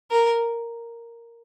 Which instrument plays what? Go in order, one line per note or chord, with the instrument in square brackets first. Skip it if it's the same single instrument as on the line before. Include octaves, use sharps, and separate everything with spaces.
[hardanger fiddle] A#4